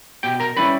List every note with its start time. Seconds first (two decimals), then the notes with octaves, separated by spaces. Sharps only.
0.23 B2 G4 G5
0.40 A#4 A#5
0.56 G3 C#4 E4 B4 B5